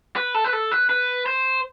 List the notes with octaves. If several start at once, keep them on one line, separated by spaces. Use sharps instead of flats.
B4
A4
B4
A4
B4
B4
C5